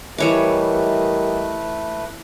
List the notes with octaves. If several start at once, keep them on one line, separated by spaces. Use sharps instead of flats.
E3 G3 A3 A#4 B4 C#5 D#5 D6